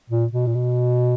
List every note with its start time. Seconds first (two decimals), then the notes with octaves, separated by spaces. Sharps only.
0.10 A#2
0.33 B2
0.46 A#2
0.55 B2